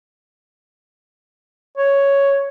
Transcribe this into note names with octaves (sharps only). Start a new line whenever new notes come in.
C#5